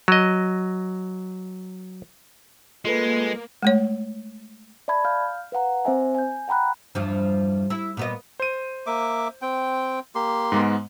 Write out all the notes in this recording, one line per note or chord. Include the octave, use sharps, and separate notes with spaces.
F#3 D#5
G#3 A#3 F4 A4 B4
G#3 A3 C#5
D5 E5 A5 B5 G#6
F5 F6 G6
B4 F5 F#5 A#5
C4 C5 E5 G#5
G#5 G6
F#5 G5 A#5 B5 F#6
E2 G2 F3
E4
A#2 B3 D#5
C5 D#7
A#3 E5 D6
C4 G5
A#3 G4 C6
G#2 G#3 B3